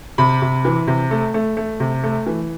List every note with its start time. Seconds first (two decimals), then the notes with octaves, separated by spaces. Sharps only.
0.18 C3 B5
0.42 C3
0.65 E3
0.87 C3
1.11 A3
1.34 A3
1.57 A3
1.80 C3
2.03 A3
2.27 E3